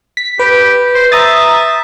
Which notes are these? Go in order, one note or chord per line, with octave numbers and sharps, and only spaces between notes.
B6
G4 B4
C5
E5 A#5 D#6 A6